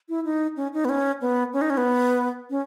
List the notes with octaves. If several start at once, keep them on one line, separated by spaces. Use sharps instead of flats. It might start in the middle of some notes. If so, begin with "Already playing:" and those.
E4
D#4
C#4
D#4
B3
C#4
B3
C#4
D#4
C#4
B3
C#4